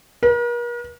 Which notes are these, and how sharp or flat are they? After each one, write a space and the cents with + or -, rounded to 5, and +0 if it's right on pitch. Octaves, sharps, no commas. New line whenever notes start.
A#4 +45